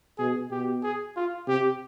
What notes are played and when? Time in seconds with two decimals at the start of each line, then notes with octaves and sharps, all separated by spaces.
0.18 B2 G#4
0.51 B2 G4
0.83 G#4
1.16 F4
1.47 C3 G4